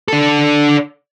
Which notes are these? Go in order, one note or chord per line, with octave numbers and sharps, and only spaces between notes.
D4 A4